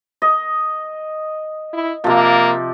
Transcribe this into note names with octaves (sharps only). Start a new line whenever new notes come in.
D#5
E4
C3 F3 A#3